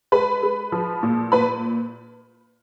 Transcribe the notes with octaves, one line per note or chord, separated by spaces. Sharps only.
G#3 B4 B5
G#3
F3
A#2
A#2 B4 B5